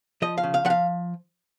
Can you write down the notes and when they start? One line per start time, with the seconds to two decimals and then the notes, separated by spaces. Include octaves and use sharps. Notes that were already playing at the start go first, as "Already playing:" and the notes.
0.22 F3 D#5
0.38 F5
0.43 C#3
0.54 F5
0.65 F3 F#5
0.70 F5